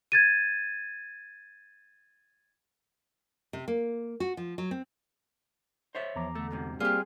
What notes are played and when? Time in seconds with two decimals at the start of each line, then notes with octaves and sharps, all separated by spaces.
0.12 G#6 A6 D#7
3.53 C3
3.68 A#3
4.20 F#4
4.37 F3
4.58 F#3
4.71 C4
5.95 C5 C#5 E5
6.16 E2 F3 A#5 D6
6.35 D3 A3
6.51 D2 G#2 C3
6.80 G3 A#3 C4 F4 G4 G#4